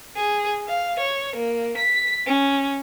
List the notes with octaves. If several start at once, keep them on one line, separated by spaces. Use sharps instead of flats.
G#4
F5
C#5
A#3
B6
C#4